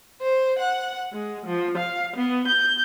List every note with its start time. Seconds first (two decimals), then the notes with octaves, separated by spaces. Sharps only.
0.23 C5
0.59 F#5
1.11 G#3
1.46 F3
1.78 F5
2.17 B3
2.47 G6